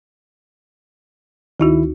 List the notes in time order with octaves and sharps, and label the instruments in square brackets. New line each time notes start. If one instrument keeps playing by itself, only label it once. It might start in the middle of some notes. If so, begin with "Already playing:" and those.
[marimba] D2 D#4 F#4 [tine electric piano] D#3 E4